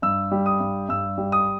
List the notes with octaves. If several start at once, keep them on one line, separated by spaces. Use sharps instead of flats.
G2 E6
G3
D#6
G2
G2 E6
G3
D#6